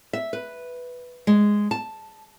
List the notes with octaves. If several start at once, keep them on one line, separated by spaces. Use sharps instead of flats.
E5
B4
G#3
A5